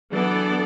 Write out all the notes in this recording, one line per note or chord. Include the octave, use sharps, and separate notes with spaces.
E3 F#3 B3 D4 A4 D5